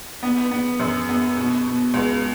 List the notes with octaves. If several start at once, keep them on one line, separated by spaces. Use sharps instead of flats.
B3
B3
F#2
B3
B2
B2
C#2